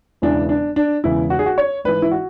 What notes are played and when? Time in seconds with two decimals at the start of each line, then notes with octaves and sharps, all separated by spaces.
0.22 E1 E2 C#3 E3 D4
0.49 D4
0.76 D4
1.04 E1 E2 C#3 E3 E4
1.30 F#4
1.39 G#4
1.46 F#4
1.58 C#5
1.84 G#1 G#2 E3 B4
2.02 E4
2.11 F#4